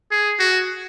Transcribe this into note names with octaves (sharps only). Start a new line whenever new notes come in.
G#4
F#4